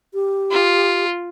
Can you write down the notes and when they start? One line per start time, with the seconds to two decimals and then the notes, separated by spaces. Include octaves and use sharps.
0.14 G4
0.52 F4